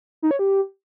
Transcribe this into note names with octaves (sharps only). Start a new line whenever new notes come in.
D#4
C#5
G4